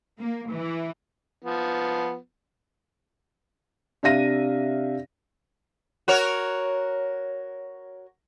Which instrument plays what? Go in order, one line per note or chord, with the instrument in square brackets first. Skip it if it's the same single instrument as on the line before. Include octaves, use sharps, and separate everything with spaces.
[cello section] A#3
E3
[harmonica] F3 B3
[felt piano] C3 D4 E5 F5 A#6 D#7
[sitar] F#4 A#4 C#5